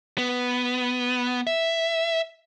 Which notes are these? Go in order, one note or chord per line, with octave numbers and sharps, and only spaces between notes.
B3
E5